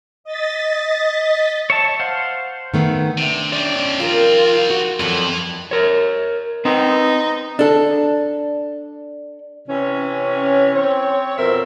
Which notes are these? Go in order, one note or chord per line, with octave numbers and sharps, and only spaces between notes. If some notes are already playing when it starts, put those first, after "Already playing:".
D#5 A6 B6
C#5 E5 A5
C5 F5 F#5
D#3 A3 B3
C3 D4 E5
G3 C4 C#4 D5
D#3 F3 F4 A#4
F#4
F2 D3 D#3 F#3 E4 B4
A#4 C#5
C4 D#4 B4
D4 A4
C3 E3 C#4
C4 C#5
F2 B2 C4 A#4 E5